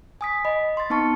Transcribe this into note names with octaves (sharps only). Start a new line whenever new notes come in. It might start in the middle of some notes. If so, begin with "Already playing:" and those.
G#5 D#6 B6
D#5 B5
C6 A6
B3 C4 D#4 A5 C#6 C#7